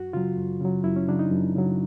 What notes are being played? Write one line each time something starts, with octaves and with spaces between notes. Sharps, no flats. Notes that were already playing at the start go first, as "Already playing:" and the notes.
Already playing: F#2 F#4
C#3 F#3 F4
F#2
C#3 F#3
F#2 E4
C#4
C#3 F#3 D4
D#4
F#2
C#3 F#3